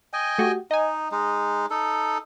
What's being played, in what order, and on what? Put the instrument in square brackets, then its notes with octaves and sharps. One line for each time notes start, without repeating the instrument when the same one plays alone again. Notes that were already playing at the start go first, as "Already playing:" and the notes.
[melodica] D#5 G5 G#5
[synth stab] A3 F#4 G4
[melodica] D#4 [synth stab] D#5 G#5
[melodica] G#3 D#4
D#4 A4